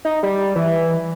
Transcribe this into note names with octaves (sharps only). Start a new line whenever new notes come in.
D#4
G3
E3